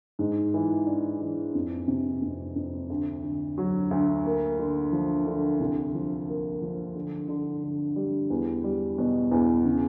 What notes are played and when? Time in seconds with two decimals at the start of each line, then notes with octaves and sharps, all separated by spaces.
0.19 G#2
0.54 E3
0.86 D4
1.21 E3
1.55 F2
1.88 C3
2.22 F2
2.56 F2
2.90 D2
3.24 D3
3.58 F#3
3.91 D2
4.25 A#3
4.59 D3
4.92 F3
5.27 D3
5.60 C2
5.94 F3
6.28 A#3
6.62 F3
6.95 D3
7.28 D3
7.63 D3
7.96 G3
8.30 E2
8.64 G3
8.98 B2
9.31 E2
9.65 C#3